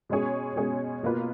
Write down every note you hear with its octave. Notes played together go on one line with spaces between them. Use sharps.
B2 G#3 C#4 G#4 C#5
B2 G#3 C#4 G#4 C#5
B2 A#3 F4 B4